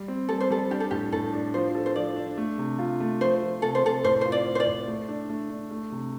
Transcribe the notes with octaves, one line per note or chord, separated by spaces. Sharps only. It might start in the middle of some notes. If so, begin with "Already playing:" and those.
Already playing: G3
C4
G3 A4
C5
G3 A4
D4 G4
A4
A2 G4
A2 A4
D4
F3 C5
A4
C5
F3 D5
D4
A3
C3
F4
A3
F3 C5
F3
C3 A4
C5
C3 A4
A2 C5
F4 C5
D5
A2
C5
D5
A2
A3
D4
A3
D4
A3
C3